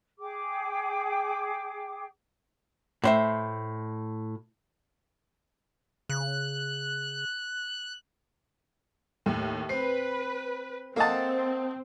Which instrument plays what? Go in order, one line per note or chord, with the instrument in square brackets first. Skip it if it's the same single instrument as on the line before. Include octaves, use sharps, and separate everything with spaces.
[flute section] G#4 G5 D6
[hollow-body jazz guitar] A2 C5 E5
[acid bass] C#3 [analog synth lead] F#6
[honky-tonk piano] D#2 A2
[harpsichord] C4 [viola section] B4 [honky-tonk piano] C7
[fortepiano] A#3 A5 [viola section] C4 [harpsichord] A4 D#5 F#5